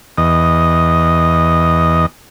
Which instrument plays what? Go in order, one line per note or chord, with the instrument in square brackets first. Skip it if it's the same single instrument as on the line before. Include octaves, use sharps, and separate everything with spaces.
[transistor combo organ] E2 D#5